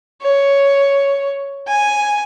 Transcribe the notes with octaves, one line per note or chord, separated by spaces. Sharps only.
C#5
G#5